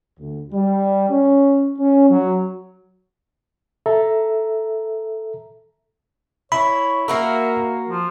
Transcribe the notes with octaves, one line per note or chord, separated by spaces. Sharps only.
D2
G3
C#4
C#4
F#3
A4 E5 A#5
E4 C#5 B5
A#3 F#4 A#4 E5
F3